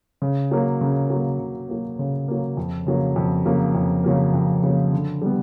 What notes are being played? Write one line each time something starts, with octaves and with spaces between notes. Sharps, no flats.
C#3
F#3 A#3
C#3
F#3 A#3
C#3
F#3 A#3
C#3
F#3 A#3
F2
C#3 F#3 A#3
F2
C#3 F#3 A#3
F2
C#3 F#3 A#3
F2
C#3 F#3 A#3
D3
G3 B3